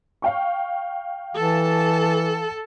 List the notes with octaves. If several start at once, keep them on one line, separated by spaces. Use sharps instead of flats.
F5 G5 C#6
E3 A4 A5